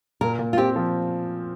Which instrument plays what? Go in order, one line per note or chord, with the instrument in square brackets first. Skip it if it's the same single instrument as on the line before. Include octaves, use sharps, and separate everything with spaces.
[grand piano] A#2 [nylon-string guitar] A#4
[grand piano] A#2
[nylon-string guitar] F4
[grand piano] C4 [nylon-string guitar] G4
[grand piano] F3